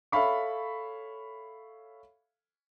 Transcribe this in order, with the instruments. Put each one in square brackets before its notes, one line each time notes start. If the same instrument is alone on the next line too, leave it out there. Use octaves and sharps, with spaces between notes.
[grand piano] A4 C#5 E5 F5 B5 C#6